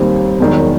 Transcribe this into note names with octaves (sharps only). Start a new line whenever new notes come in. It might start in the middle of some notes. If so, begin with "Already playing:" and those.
Already playing: D#2 D#3 G3 C4
E1 E2 D#3 F#3